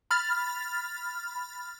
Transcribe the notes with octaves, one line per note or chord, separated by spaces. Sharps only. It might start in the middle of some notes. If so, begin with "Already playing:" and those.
B5 F6 A6